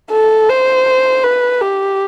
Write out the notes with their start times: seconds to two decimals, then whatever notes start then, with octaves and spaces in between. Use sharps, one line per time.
0.11 A4
0.49 C5
1.24 B4
1.61 G4